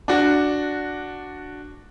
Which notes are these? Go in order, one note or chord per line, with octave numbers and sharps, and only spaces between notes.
D4 F#4